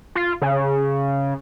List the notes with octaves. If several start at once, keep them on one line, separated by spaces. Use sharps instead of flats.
F4
C#3